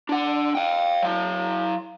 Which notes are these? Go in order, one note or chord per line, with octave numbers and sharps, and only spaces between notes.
D4 F#5
F5 G5
F#3 F5